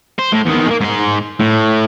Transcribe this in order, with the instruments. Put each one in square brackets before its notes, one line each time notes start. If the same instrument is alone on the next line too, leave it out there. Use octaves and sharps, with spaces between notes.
[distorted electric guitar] C5
A2
E2 D#3
G#3 A#3
G#2 C6
A2